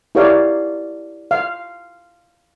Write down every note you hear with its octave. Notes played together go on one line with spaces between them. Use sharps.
E4 G4 A#4 C#5 D5 F5
F5